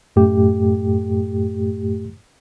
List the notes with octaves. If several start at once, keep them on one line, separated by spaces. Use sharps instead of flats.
F#2 A2 A3 G4